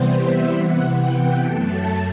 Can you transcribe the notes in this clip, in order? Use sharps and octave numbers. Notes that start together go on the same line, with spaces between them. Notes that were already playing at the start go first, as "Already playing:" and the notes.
Already playing: C3 E3 G3 B3 C5
E5
C3 E3 B3 F#5
G5
F#2 F#3 A3 A5